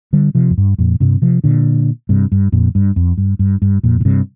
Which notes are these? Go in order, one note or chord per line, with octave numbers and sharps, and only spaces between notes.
D3 G3
C3 F3
F2
G2
F2 A#2
G2 C3
C3 F3
A#2 D3
G2 C3
G2
F2 A#2
G2
F2
G2
G2
G2
F2 A#2
A#2
G2 C3